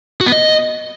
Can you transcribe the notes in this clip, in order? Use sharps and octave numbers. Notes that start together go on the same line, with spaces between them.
F#4
B3
D#5